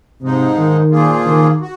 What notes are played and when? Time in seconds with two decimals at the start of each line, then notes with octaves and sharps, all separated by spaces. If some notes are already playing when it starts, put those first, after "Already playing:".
0.21 G#2 C3 F3 G#3 D#4
0.57 D#3
0.91 A#2 F3 A#3 F4 G#4
1.26 D#3
1.61 F#4